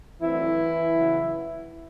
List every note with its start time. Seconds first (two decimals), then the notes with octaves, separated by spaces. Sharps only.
0.22 D3 E3 F#3 A3 C4 E4
0.93 C#3 F#3 B3